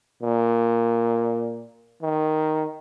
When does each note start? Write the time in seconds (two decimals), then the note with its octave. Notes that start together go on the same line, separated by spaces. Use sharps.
0.22 A#2
2.02 D#3